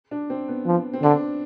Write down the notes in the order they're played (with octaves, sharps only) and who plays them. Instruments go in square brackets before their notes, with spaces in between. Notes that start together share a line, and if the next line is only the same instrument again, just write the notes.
[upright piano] D4
C4
B3
[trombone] F3
[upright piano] C4
[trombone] D3 [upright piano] D4